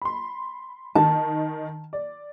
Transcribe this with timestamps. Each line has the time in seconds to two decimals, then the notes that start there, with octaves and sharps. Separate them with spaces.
0.02 B5 C6
0.95 D#3 A5
1.93 D5